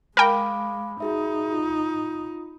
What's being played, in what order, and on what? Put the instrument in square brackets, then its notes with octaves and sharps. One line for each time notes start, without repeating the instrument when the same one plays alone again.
[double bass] G#3 [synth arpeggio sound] A#4 G5 [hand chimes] F5 D6 [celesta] B5
[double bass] D#4 [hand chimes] F#4 G#4 E5
[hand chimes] F4